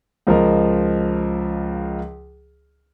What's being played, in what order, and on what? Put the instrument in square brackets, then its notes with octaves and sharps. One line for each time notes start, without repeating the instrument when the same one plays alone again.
[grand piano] C#2 F3 A#4 D#5